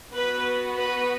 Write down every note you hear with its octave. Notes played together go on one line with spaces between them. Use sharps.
B3 F#4 B4
B4